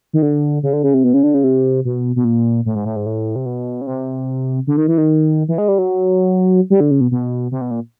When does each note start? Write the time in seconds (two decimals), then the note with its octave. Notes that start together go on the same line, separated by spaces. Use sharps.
0.13 D#3
0.22 D3
0.63 C#3
0.73 D3
0.83 C#3
0.94 C3
1.04 B2
1.14 C#3
1.23 D3
1.34 C#3
1.44 C3
1.85 B2
2.16 B2
2.24 A#2
2.66 A2
2.75 G#2
2.85 A2
2.96 G#2
3.06 A2
3.36 C3
3.46 B2
3.81 C#3
3.87 C3
4.67 D3
4.77 D#3
4.88 E3
4.98 D#3
5.48 E3
5.58 G#3
5.68 G3
5.78 F#3
6.70 G3
6.80 D3
6.91 C#3
7.01 B2
7.11 B2
7.51 C3
7.61 B2
7.71 A#2